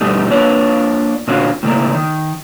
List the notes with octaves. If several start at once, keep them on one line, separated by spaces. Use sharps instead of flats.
G2 B2 G3 A3 D#4
A#3 D4 F4 B4 C#5
A#2 D3 C#4 F4 F#4
A2 C#3 A3 A#3
D#3